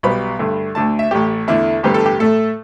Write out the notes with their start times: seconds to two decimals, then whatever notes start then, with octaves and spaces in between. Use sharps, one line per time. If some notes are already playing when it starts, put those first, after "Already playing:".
0.03 B1 B2 G3 B3 B5
0.39 G2 D3 A3
0.75 D2 D3 A3 A5
0.99 E5
1.11 A1 A2 A3 G4
1.47 E2 D3 A3 E4
1.83 A1 G2 D3 G3 B3 G4
1.94 A4
2.06 G4
2.19 A2 A3 A4